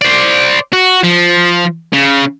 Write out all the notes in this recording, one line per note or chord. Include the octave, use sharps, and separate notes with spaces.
C5 D5
F#4
F3
C#3